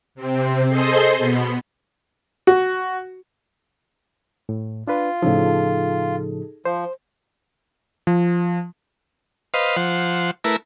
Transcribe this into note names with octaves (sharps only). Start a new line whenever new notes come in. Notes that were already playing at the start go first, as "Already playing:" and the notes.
C3 C4
G#4 A4 C5 D#5 C6
B2 B3
F#4
A2
D4 F4 B4
A2 C#3 F3 D#4 G#4 A4
F3 C5
F3
B4 C5 D#5 F5
F3 C5 F#5
A3 E4 A#4 B4